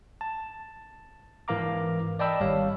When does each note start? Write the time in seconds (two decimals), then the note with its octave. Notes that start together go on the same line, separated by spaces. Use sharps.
0.21 A5
1.48 G#2 E3 A#4 F5 A#5 D6
2.19 D5 D#5 G5 A5 B5 E6
2.40 G#1 G3 C#5 F5